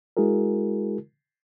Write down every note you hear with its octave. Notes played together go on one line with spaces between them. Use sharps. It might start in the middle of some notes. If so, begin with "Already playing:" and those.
G#3 E4 F#4 G#4 A#4